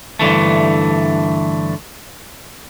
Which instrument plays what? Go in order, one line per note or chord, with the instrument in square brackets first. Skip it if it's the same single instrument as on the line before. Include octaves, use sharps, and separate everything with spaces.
[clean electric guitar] G2 D3 E3 A3